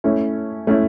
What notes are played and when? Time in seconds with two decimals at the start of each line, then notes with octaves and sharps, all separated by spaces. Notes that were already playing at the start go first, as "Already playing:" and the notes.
0.04 A3 C#4 E4
0.67 A3 C#4 E4